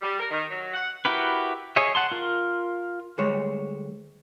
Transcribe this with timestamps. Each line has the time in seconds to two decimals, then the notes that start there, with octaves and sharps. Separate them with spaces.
0.02 G3
0.19 A#4
0.30 D#3
0.50 F#3
0.74 F#5
1.05 E4 F#4 G4 A#4 B4
1.76 G#4 C#5 D#5 E5
1.95 F#5 A5 C6
2.12 F4 A#4
3.18 D2 G3 G#3 C#5